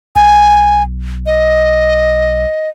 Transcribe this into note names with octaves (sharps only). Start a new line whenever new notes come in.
B1 G#5
D#5